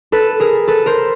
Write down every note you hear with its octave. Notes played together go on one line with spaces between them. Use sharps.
A4 B4
G#4 A#4
A4 B4
A#4 C5